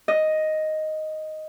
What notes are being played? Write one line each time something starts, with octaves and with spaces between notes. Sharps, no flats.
D#5